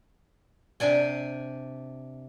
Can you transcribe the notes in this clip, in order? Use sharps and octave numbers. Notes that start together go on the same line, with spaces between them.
C3 D4 D5 G#5